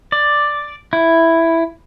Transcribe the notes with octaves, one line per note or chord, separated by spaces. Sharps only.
D5
E4